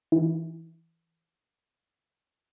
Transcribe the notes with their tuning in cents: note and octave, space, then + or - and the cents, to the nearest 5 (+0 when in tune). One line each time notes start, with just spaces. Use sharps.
E3 -5